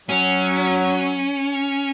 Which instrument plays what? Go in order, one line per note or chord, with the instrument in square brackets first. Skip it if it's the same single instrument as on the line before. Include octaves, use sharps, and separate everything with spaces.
[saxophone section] F#3 [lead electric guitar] C#4